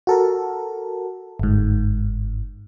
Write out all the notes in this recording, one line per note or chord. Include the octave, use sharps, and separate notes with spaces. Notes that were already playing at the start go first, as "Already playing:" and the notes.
F#4 A4 A#4
G1 G#2